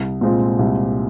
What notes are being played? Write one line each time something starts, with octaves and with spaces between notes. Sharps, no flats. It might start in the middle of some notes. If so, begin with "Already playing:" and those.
Already playing: C2
A#2 G#3 C4 F4
C2